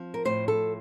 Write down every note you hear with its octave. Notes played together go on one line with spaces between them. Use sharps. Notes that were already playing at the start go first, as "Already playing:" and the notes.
Already playing: F3 C4
A#4
A2 C5
A4